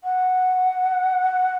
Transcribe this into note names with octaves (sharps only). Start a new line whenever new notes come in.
F#5